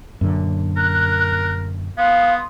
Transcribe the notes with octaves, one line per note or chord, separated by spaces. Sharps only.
F#2 A#2 D3
A#4 F#6
B3 F5 C6 D#6